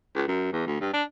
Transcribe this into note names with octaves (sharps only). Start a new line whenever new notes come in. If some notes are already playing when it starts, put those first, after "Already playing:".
C#2
F#2
E2
D2
G2
D4